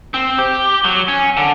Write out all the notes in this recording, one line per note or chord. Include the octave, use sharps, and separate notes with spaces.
C4
G4
F#3
C#4
D3